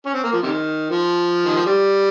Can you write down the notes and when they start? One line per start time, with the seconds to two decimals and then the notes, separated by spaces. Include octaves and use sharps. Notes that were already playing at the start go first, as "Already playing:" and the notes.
0.06 C#4
0.14 C4
0.23 A#3
0.33 F3
0.42 C3 D#3
0.90 F3
1.45 D#3
1.56 F3
1.66 G3